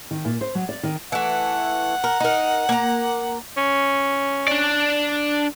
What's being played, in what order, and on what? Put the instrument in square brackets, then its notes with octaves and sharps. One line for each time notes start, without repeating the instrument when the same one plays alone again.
[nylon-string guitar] D#3
A#2
C5
F#3
D5
D#3
[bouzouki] E3 A3 [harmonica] F#5
[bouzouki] A#4
D#4 A#4
A#3 A#5
[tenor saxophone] C#4
[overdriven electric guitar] D4 D5